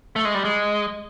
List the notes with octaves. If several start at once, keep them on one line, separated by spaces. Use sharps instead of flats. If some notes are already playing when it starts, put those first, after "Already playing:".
A3
G#3
G3
G#3